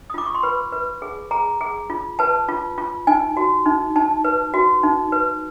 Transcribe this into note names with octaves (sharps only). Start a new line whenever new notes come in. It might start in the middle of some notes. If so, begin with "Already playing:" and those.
D#6
F4 D6
C#6
C6
B4 B5
B4
G#4
G#4 A#5
G#4
F4
B4 A5
F4
F4
D#4 G#5
F#4
D#4
D#4 A5
B4
F#4
D#4
B4